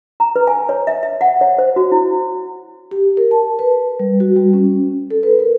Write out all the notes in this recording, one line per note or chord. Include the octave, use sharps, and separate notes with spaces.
A#5
B4
G#5
C#5
E5
E5
F#5
C#5
C5
F#4
E4
G4
A#4
A5
B4
G3
F#4
G3
C#4
A4
B4
A#4